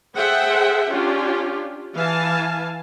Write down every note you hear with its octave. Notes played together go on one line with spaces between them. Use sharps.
G#4 A4 C5 E5 F#5 G5
C#4 D4 F4 G4
E3 F5 G#5 A5